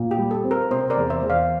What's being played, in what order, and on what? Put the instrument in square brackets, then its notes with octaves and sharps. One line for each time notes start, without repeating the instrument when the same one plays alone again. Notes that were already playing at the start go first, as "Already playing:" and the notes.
Already playing: [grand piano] A#2
[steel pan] G4
[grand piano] G3
[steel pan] A4
[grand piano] C4
[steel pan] A#4
[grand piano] C3 [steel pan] C5
[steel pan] A#4 D5
[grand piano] E2
[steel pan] C5 E5
[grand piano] E2
[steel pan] D5 F5